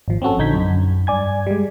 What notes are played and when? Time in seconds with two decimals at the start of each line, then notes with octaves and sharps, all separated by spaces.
0.08 G#1 F3
0.22 C4 C#4 F#4 A4
0.38 A#1 D3 D#4 G6 G#6 B6
0.54 F#2
1.07 G2 D5 G#5 G#6
1.47 G3 G#3